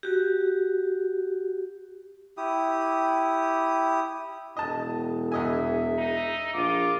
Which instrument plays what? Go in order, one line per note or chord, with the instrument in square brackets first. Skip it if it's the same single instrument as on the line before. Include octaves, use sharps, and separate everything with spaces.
[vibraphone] F#4 G4
[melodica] E4 G4 D#6
[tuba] E1 [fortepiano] D#5 A5
[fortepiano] E2 D#5 G#5 [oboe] E5
[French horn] D#4
[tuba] A#1 [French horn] F4 [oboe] D6